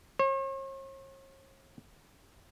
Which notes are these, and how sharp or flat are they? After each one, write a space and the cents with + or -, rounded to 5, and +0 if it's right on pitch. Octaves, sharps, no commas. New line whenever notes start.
C#5 -45